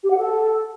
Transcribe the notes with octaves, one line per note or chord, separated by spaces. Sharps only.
G4
F#5
A4